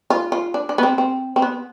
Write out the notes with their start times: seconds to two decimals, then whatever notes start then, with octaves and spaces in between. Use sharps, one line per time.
0.10 F4
0.32 F4
0.54 D4
0.69 D4
0.78 B3
0.83 C4
0.98 C4
1.36 C4
1.42 B3